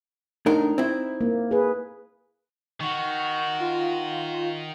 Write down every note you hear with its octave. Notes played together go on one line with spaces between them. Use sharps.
A2 D4 D#4 A#4
C4 E4
A#3
G#4 B4
D#3 F#4 C#6
F4